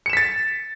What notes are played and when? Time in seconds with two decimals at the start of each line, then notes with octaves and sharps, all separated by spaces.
0.06 C#7
0.10 E7
0.13 B6
0.17 A6